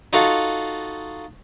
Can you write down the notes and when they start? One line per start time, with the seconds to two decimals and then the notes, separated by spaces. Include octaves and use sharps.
0.13 D#4 F4 F#4 A4